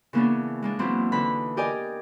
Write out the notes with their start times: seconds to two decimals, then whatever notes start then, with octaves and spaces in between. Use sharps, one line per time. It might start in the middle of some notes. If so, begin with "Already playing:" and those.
0.13 C#3 E3 A#3 B3 C#4 D4
0.62 G#3 A#3 D4
0.79 B2 E3 F#3 C4 E4 F4
1.12 D3 E3 D#4 B4 B5
1.57 G4 A#4 D5 D#5 G5 G#5